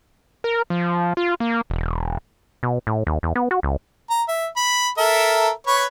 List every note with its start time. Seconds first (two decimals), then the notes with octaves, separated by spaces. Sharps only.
0.44 A#4
0.70 F3
1.17 F4
1.40 A#3
1.70 E1
2.63 B2
2.87 A2
3.07 D#2
3.23 E2
3.35 B3
3.51 F#4
3.63 C#2
4.10 A#5
4.28 E5
4.56 B5
4.98 A4 A#4 E5
5.67 B4 C#5 C#6